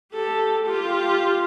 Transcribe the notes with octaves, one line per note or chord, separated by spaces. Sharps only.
G4 A4
F4 G4